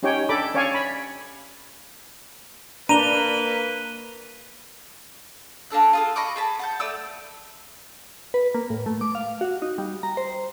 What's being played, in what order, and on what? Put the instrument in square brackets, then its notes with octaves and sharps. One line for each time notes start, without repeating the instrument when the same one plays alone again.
[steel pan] C#4 D#4 G4 C#5 G5 G#5
D4 A4 D5 B5 D6
C#4 C#5 D5 F5 G#5 C#6
B5
[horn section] A#3 B4 [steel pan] D4 [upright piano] A#5 [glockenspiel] D#7 F7 G7
[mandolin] A#3 D4 A4 F#6
F4 G#4 A4
D#5 B5 C#6 D6
G#4 A5 B5
F#5 A5 G6
A3 D5 E6
[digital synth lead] B4
A#3
A2
A3
D6
F5
F#4
D#4
G3
A#5
C5